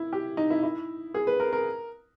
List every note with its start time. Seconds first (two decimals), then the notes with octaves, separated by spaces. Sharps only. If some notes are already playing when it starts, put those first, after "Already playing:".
Already playing: E4
0.13 G4
0.37 D#4
0.50 E4
0.63 E4
1.14 G#4
1.27 B4
1.40 A#4
1.53 A#4